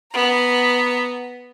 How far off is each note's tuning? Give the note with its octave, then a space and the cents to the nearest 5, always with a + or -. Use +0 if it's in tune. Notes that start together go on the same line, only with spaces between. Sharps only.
B3 +0 A#5 +0